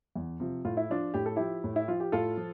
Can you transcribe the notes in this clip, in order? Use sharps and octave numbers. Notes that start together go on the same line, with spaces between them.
E2
C3 F3
A2 F4
E4
F3 D4 F4
A2 G4
A4
F3 E4 G4
A2
E4
F3 F4
G4
A2 F4 A4
F3